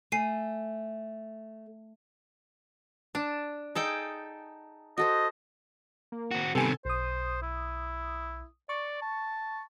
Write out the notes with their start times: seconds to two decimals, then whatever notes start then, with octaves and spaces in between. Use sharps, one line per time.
0.12 A3 G#5 C7 D#7
3.15 D4 A5
3.75 D#4 G#4 A4 G5
4.98 F#4 A4 C5 D#5
6.12 A#3
6.31 C4 F#4
6.55 C3 D#3 G3 B3 A4 G#5
6.85 B1 C5 D#6
7.42 E4
8.69 D5 C#6
9.02 A5